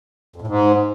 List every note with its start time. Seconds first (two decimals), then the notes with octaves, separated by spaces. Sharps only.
0.36 F2
0.42 A2
0.47 G#2